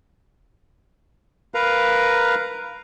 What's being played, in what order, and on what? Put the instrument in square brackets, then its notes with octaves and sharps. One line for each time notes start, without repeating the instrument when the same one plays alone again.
[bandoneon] A#4 B4 F5 A#5